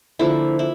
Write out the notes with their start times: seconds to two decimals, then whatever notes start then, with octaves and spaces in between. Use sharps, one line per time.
0.19 D3 F3 A#3 E4
0.59 E4